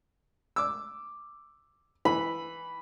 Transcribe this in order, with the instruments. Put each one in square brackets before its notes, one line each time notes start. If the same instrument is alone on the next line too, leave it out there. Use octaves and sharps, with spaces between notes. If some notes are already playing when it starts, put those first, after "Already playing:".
[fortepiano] D6 E6
[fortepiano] E3 [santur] B5